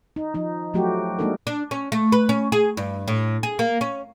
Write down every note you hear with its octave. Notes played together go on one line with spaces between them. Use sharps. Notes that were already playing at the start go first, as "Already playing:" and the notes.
D#4
F3 D#4
F3 F#3 A3 F#4 G4
G#3 A#3 D4 D#4 A4 A#4
D4
C#4
A3
B4
C#4
G#4
G2
A2
G#4
A#3
C#4